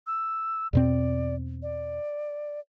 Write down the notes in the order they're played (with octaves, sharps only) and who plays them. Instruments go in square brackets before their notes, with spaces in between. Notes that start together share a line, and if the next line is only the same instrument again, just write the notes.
[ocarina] E6
[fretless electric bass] E2 B2 C4 [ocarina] D5
[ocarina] D5